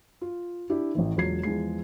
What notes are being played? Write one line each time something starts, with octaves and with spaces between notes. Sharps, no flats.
F4
D4 E4 G4
A1 A2 E3
E1 F#3 F4 C#5 G#6 C7
E2 F3 G#3 C7